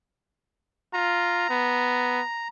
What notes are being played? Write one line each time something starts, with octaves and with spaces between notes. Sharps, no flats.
F4 A#5
B3